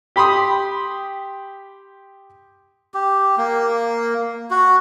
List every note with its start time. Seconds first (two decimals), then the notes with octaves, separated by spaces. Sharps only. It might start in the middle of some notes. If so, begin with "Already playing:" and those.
0.16 G4 B5 C6 D#6
2.94 G4
3.38 A#3
4.51 F#4